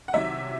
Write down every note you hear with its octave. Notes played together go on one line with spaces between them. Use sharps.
F#5
C2 C3 D#3 F#3 E5